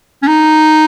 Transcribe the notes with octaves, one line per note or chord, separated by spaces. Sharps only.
C#4
D#4